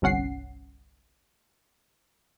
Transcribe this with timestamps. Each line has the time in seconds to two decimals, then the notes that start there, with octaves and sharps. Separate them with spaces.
0.02 G1 C2 C#4 F#5 C7